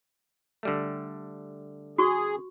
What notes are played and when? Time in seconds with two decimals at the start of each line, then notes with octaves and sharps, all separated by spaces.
0.63 D3 G3 A3
1.98 F#4 G#4 C#6